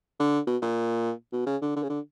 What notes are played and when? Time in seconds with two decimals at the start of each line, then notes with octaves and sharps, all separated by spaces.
0.20 D3
0.47 B2
0.62 A#2
1.32 B2
1.47 C#3
1.62 D3
1.76 D3
1.83 C#3
1.90 D3